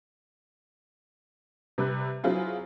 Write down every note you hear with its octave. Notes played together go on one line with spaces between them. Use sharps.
C3 G3 B4
F#3 C4 E4 F4 G#4